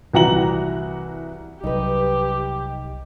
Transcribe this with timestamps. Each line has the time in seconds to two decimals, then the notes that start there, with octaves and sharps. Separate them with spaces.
0.13 C2 E3 F#4 F#5 A#5 F#7
1.64 C2 F#3 G3 D#4 G4 B4